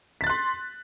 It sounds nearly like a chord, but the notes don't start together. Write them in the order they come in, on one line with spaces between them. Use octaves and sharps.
B6 A6 F#6 C6